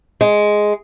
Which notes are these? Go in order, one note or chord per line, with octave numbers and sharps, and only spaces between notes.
G#3